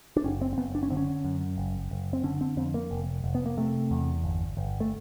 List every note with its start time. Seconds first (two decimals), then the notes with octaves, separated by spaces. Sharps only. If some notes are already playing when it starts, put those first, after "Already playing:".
0.16 D4
0.24 F#1 C#4
0.41 C4
0.53 C4
0.57 F#1 B3
0.75 D4
0.83 C#4
0.90 D3 C4
0.97 C#4
1.24 F#2
1.58 F#1
1.91 F#1
2.13 C4
2.24 D3 C#4
2.41 C4
2.57 F2 C4
2.74 A#3
2.91 F1
3.24 F1
3.35 B3
3.46 A#3
3.57 C3 A3
3.91 E2
4.23 G1
4.57 G1
4.80 A3